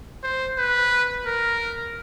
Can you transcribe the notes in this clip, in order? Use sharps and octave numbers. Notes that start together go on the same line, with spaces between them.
C5
B4
A#4